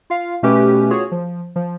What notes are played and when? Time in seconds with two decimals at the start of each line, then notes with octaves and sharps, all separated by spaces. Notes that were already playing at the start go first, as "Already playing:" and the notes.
0.10 F4 F5
0.43 B2 A3 C#4 G4 B4
0.90 F4 F#4 G#4 C#5
1.12 F3
1.56 F3